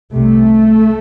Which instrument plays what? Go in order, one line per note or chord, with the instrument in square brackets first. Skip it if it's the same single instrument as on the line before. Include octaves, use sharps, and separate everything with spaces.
[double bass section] C2 C3 A3